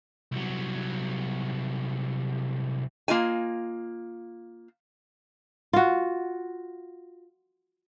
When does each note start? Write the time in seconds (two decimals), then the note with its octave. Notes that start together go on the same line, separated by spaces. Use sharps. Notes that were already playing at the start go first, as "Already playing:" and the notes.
0.32 C2 F#3
3.08 A#3 F4 D#5 G#5
5.73 F4 F#4